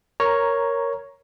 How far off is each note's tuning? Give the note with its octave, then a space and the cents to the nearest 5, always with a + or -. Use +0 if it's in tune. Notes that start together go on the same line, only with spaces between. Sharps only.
A#4 +0 C#5 +0 A#5 +10